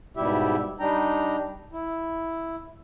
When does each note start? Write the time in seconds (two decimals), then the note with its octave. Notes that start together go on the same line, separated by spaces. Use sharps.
0.17 G#2 B2 G3 E4 G4 E5
0.80 G3 D4 D#4 G5 A#5
1.73 E4